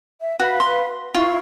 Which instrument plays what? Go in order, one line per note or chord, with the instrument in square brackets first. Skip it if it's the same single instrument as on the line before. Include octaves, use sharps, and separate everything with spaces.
[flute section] E5
[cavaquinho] F#4 [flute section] B4 F5
[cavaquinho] C6
[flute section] E4 F5 C#6 [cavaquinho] F4